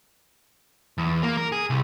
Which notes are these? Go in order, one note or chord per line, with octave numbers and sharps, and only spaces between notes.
E2
A#3
A#4
G#4
C2